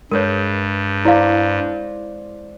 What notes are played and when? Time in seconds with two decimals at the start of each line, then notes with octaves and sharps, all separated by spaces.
0.11 G2 G#3 A#4 B4 C#5
1.05 E4 C5 D5 F5